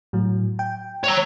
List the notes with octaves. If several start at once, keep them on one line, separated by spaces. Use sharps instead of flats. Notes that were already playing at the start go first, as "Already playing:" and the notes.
A2 F#3
G5
C#5 A#5